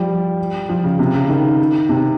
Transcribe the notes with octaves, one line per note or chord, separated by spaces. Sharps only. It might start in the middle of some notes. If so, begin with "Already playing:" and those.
Already playing: F3 G3
F3
C#3
C3
C#3
D#3
C3